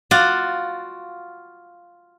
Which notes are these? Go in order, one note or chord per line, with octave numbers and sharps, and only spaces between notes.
F4 F#4 D5 F5 F#5